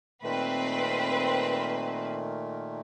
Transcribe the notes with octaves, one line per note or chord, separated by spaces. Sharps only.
A#2 D#3 A3 C4 B4